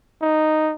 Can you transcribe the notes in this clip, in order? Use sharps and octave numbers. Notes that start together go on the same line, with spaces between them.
D#4